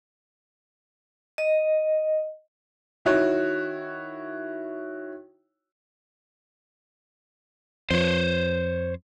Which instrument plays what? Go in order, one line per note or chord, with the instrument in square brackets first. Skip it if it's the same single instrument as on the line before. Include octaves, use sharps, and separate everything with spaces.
[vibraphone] D#5
[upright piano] D#3 E4 F#4 C#5
[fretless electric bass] F2 F3 [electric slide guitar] C5 C#5